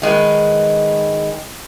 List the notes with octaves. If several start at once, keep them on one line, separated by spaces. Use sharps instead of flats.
D#3 G#3 B4